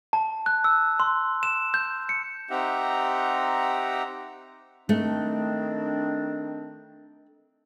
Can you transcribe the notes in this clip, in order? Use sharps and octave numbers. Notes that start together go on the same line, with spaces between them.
A5
F#6
E6
C6
E7
G6
C#7
C4 D#4 G4 E5 F#5 A#5
D#3 A3 C4 D4